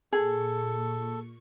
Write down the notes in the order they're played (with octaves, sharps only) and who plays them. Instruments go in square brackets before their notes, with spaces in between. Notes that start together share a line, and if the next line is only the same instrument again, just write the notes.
[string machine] A#2 C#6 C#7 [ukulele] G#4 [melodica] A4